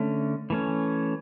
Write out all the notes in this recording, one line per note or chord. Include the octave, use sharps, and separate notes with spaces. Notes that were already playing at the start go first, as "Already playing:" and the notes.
Already playing: D3 A3 C#4
E3 A3 C#4